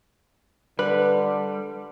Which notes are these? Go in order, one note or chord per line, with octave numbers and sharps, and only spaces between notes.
D3 G3 B4